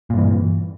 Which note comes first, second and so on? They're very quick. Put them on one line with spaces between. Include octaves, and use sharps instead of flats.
A#2 G2 E3